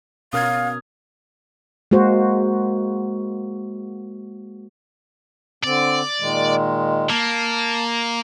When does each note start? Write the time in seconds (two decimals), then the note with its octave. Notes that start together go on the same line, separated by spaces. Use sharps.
0.33 B2 C#4 A#4 F5 D#6 F6 G#6
1.91 G#3 A#3 F#4 C5
5.64 D3 C4 D5
6.20 A#2 D#3 G#3
7.09 A#3 A5